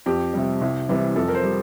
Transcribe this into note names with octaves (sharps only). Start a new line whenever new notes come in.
F2 G4
C3 G3
C2
C3 E3 G3
F2 A4
A#4
C5
G3